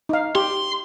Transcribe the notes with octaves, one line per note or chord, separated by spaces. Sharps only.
D#4 F5
G4 C6